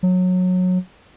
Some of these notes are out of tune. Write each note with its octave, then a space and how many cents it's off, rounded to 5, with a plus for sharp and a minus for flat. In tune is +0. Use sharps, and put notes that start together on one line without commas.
F#3 -20